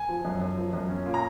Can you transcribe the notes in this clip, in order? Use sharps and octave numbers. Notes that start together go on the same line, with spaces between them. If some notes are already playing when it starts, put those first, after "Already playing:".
Already playing: G#5
F3
F#2
F#2
F3
F#2
C#4
A#2
A#5